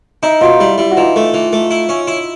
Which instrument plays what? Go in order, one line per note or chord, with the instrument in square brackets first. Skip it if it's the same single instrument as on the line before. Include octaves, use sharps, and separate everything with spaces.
[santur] D#4 [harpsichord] E4
[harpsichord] B2 [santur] D#4 F4
[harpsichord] G3 [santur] E4
[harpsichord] G3 [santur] E4
[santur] F#4
[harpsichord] E3 [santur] D#4 F4
[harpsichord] A3
E3
A3
E4
C#4
E4